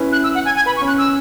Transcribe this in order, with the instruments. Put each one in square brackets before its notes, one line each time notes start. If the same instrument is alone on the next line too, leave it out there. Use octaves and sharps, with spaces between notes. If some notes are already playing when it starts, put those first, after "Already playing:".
Already playing: [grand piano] C#4 E4 B4
[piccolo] F#6
E6
F#5
G#5
G#5
[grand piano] B4 [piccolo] B5
[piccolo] C#6
[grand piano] C#4
[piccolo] F#6
E6